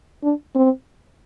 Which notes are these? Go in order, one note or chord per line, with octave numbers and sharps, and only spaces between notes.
D4
C4